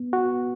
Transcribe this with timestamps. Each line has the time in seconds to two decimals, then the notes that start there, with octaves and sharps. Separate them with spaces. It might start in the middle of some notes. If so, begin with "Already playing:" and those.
Already playing: B3
0.13 F#4